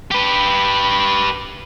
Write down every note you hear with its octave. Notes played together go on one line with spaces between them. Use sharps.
G4 B4